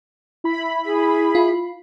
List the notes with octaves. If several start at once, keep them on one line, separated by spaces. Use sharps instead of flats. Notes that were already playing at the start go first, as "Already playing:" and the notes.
E4 B5
G#4
F4